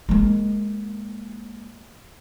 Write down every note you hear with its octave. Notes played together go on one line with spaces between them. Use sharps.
G#3 A#3